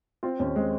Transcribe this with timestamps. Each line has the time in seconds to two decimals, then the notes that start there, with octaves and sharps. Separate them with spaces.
0.23 C4 F4
0.39 D#2 C#4
0.56 G#3 C4